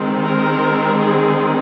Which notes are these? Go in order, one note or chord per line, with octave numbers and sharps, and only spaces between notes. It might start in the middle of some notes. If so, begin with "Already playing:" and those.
Already playing: D#3 G#3 C4
A#4
G#4